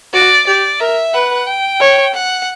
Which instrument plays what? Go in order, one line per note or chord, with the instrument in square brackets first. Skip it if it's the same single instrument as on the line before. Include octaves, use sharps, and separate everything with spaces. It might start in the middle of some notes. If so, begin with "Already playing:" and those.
[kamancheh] F#4 [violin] D5
[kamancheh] G4 [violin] D5
[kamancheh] A#4 [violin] E5
[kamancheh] B4 [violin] F#5
[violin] G5
[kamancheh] C#5
[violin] F#5